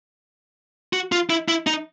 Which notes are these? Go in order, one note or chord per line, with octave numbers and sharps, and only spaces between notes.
F#4
F4
E4
E4
D#4